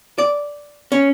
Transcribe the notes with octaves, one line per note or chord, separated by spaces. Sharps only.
D5
C#4